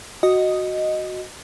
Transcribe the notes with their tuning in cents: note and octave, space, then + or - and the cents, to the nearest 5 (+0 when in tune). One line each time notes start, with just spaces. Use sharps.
F#4 +0 D#5 +0